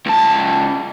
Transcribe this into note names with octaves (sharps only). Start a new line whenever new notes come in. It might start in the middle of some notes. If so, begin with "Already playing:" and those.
C#2 A5